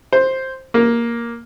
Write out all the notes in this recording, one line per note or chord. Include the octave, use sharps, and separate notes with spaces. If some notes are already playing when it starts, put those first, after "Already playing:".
C5
A#3